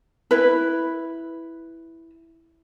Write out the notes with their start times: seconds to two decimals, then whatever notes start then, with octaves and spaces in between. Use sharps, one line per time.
0.31 E4 B4